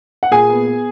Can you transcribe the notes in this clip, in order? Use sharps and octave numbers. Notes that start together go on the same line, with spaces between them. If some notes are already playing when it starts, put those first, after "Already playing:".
F#5
A#2 G#4 G#5
B3
B3